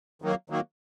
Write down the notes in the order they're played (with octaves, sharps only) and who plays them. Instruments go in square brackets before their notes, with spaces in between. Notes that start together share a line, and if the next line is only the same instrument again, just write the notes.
[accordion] D#3 F#3 A#3
D#3 F#3 A#3